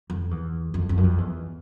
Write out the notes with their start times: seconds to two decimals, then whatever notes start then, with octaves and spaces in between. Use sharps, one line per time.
0.10 F2
0.31 E2
0.74 F2
0.89 F2
0.97 F#2
1.04 F2
1.18 E2